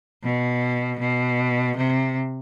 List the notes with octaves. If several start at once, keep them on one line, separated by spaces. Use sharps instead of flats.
B2
B2
C3